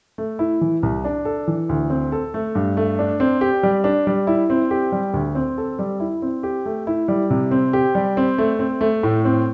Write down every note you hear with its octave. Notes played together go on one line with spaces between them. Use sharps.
A3
E4
E3
C2
D4
A4
E3
D2
C4
A4
A3
G2
A3
D4
C4
G4
G3
D4
G3
E4
C4
G4
G3
D2
C4
A4
G3
E4
C4
G4
A3
E4
G3
C3
C4
G4
G3
C4
A3
C4
A3
A2
C4